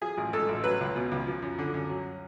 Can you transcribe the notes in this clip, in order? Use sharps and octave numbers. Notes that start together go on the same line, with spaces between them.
F3 G#4
A1
G#2 A4
A1
F#3 B4
C#2
B2
C#2
F3
F#2
D3
F#2
F#3